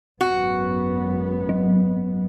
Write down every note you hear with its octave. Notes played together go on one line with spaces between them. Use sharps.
G#1 F#2 B3 F#4
F#3